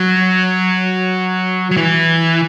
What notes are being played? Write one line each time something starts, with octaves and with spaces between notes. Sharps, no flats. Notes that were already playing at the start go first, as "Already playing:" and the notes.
Already playing: F#3
F#3
E3